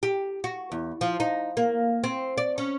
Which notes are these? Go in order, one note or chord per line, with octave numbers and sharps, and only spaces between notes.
G4
F#4
E2
F3
D#4
A#3
C4
D5
C#4